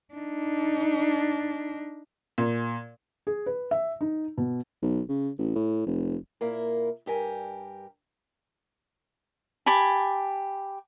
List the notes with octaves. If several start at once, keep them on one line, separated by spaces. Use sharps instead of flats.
D4 D#4
A#2
G#4
B4
E5
D#4
B2
B1
C#3
A1
A2
F1
A#2 A#3 E4 A#4
G2 G4 A#4 G#5
G4 G#5 A5 B5